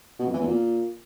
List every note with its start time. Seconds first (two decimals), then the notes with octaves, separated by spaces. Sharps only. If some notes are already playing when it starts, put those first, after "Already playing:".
0.19 B2
0.26 F2
0.33 E3
0.40 E2
0.47 A#2